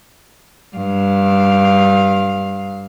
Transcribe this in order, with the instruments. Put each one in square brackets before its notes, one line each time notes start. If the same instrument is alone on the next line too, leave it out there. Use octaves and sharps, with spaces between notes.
[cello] G2 F5